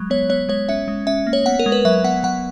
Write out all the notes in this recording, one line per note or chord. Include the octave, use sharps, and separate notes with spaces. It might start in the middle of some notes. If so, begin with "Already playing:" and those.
Already playing: F#3 G#3
B3 C#5
B3 C#5
G#3 C#5
C#4 E5
G#3
C#4 E5
A#3
C#5
B3 F#5
A#4
G#3
B4
F#3 E5
B3 F#5
F#3 F#5